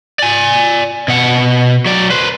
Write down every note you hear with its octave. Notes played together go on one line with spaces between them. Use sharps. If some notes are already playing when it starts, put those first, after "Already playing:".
D5 G#5
B2 F#5
F#3 D5
B4 C5